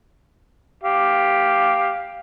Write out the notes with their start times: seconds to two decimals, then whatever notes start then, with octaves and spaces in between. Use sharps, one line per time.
0.83 G4 F5